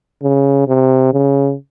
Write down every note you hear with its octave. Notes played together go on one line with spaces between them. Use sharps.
C#3
C3
C#3